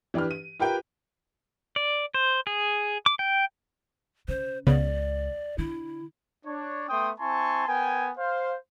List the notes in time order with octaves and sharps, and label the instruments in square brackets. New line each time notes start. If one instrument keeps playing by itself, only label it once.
[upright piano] E3 D4 G4 B4 F6
D#7
F4 G4 A#4 B4 G5
[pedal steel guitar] D5
C5
G#4
D6
G5
[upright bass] C#3 [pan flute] C5
[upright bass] C#2 [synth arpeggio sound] C#3 B3 [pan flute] D5
[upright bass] D3 [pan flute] E4
[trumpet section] D4 C#5
A3 B3 G5 C6 D#6
C4 E4 G#5 A5 C6 C#6
B3 A#4 G5 G#5
C5 F5